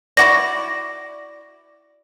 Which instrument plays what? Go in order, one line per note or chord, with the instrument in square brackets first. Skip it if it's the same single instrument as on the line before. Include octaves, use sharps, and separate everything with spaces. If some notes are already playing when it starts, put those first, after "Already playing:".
[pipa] E4 F#4 D5 [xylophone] A#6